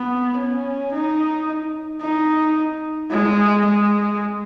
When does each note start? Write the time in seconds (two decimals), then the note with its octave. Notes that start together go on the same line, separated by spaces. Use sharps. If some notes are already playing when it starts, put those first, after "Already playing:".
Already playing: B3
0.38 C#4
0.92 D#4
2.02 D#4
3.11 G#3
3.66 G#3